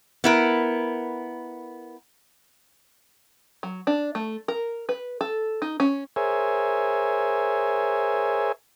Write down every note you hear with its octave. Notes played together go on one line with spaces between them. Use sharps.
B3 E4 A#4
F#3
D4
A3
A#4
B4
A4
D#4
C#4
G#4 A#4 C5 C#5 E5 G#5